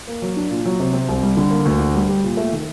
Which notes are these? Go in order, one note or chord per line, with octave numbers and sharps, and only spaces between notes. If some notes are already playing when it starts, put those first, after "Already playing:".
A#3
F#3
D4
A#2
F#3
C3
C4
C2
G3
D3
A#3
D2
D4
G3
G4
A#2
A3
D#3